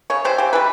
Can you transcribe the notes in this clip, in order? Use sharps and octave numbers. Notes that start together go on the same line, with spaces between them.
C#3 C#5
E3 G3 C5
C#3 G4
E3 G3 B4